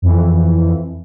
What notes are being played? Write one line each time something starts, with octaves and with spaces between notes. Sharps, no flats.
F2 E3